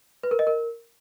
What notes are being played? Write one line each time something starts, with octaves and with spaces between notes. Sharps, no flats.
B4
A#4
D#5
A#4